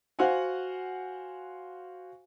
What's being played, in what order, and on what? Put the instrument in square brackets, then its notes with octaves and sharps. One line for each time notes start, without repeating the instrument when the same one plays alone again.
[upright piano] F#4 C5 F5 F#5 G#5